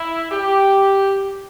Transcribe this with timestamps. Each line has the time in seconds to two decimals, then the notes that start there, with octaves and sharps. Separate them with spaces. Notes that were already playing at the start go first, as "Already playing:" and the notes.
Already playing: E4
0.31 G4